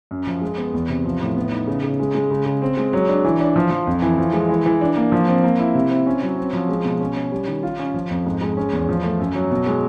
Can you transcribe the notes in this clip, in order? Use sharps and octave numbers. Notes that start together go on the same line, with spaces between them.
F#2
F3
G#3
B3
E2
C3
F3
A2
B3
D#4
C#3
C#3
G#3
G#3
C#3
C#3
C4
G#3
F#3
D4
E3
D4
F3
F3
F2
E3
F3
G#3
E3
E3
D4
A#3
F3
C4
A#3
E4
C3
C4
C#4
F#3
C4
F3
G#3
B2
C#4
C#4
G3
D#3
F4
C#4
F3
F2
G#2
G#3
C#4
E2
F3
A3
F#2
F#3
B2
G#3